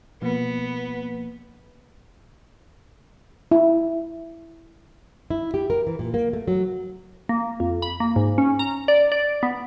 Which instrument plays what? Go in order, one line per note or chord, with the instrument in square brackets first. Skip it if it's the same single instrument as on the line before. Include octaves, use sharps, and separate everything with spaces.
[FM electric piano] B2 F3 A#3 [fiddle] B3
[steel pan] E4
[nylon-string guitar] E4
G4
A#4
E3
A#2
A#3
A3
F#3
[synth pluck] A#3
F2
B5
A#3
G#2
C#4
A#5
D5
D5
B3